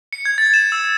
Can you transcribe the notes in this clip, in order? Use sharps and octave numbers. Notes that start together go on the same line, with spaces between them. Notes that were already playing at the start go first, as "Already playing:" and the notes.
C#7
G#6
A6
E7
E6